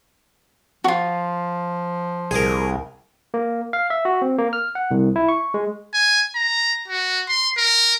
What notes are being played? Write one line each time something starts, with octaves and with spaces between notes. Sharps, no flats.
F3 F4 F#4
C2 G#4 A#4
A#3
F5
E5
F#4
C4
A#3
F6
F#5
C2
E4
C#6
G#3
G#5
A#5
F#4
C6
A#4